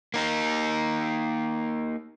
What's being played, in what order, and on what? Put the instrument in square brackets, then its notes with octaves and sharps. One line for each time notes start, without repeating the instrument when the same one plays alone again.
[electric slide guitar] A#3 D#4